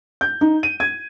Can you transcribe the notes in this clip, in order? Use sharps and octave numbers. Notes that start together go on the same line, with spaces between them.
G6
D#4
D#7
G#6